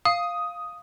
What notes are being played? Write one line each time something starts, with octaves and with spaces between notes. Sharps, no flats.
F5 D#6